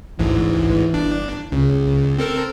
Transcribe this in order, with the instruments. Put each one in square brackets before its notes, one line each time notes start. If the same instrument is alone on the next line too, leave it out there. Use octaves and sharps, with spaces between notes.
[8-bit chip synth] A1 D2 G#2 [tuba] E3
[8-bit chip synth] G1 D4
[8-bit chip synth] C#2 [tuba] C#3
[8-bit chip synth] C4 A4 A#4